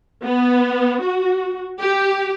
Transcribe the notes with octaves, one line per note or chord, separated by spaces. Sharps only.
B3
F#4
G4